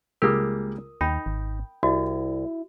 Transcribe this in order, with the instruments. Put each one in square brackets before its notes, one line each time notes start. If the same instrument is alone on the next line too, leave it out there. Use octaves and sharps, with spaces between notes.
[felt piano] C#2 G#4 D#6 [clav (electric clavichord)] G3 A#3 G4 [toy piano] A#4
[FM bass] D#2 [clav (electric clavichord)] D#4 [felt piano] G5 [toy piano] B5
[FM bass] G#1
[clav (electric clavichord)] C2 [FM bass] E4 [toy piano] F#4 D#5